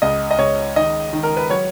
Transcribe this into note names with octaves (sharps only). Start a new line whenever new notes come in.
C#2 D#5
D#5
C#2 C#5
D#3 D#5
D#3
A#4
B4
F#3 C#5